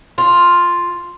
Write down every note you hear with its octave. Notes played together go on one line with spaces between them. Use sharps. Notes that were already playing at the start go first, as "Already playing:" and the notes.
F4